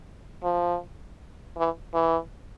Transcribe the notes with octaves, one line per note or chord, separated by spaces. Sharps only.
F3
E3
E3